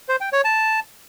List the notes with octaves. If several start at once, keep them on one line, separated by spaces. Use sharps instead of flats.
C5
G5
C#5
A5